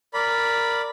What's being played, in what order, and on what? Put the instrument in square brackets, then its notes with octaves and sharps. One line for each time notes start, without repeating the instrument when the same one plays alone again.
[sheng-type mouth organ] A#4 D5 B5